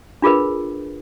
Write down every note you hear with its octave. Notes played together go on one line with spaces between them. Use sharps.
D4 F4 G#4 A#4 B4